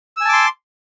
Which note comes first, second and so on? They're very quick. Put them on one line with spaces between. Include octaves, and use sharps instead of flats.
E6 G#5 A5 D6 C6